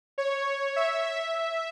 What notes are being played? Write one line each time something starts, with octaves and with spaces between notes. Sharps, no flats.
C#5
E5
E5